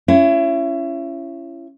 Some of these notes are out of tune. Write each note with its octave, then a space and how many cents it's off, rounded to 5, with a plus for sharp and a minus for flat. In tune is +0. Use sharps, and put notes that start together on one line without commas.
C#4 +0 E4 +35